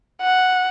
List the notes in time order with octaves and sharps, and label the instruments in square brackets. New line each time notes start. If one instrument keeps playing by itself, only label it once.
[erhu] F#5